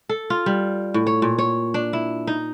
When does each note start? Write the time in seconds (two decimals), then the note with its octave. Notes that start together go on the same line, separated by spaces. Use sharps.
0.09 A4
0.30 F4
0.46 G3
0.94 A2
1.07 C#5
1.22 A#2
1.38 C#5
1.74 D4
1.93 E4
2.27 D#4